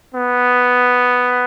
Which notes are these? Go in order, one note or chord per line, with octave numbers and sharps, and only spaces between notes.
B3